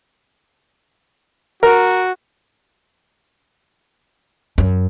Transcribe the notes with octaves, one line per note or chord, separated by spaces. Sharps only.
F#4 A#4
F#2